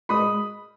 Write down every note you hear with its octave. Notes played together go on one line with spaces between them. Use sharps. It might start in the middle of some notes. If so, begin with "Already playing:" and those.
G#3 B5 D#6